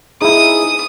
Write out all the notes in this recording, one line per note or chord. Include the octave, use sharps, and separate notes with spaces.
D#4 E4 G#4 D#6